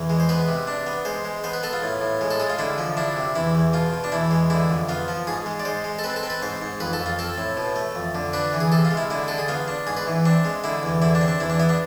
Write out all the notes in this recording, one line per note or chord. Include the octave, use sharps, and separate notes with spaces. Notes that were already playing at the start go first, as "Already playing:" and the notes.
Already playing: E2
G#3
C5
B3 B4
C3
D4
B3
G#3 C5
G#3
B3 C5
B4
B3 A4
F4
A2
A2
G#3
A4
G#3 G#4
F4
D3 E4
F3
D4 E4
C3
E2 E4
E2
B2 F4
B2
D4
E2 E4
G#3
D3 E4
F2
B3 F4
F3
G#2 G#4
G#3
D5
G#3 C5
G#3
A4
C4 B4
A4
C4
B4
G#2 C5
G#2
F2 B4
A4
F2
F4
C4 A4
A2
B2
A3
F2
D3
D4 B4
E3
G#4
C3 A4
F4
G#3
E4
D3 E4
D3 A4
G#4
B3 F4
D4
G#2 G#4
B4
E3
C4 D4
G#3
D3 E4
E2
D3 E4
D4
C4
D4
E2 E4
D4
B3 E4
D4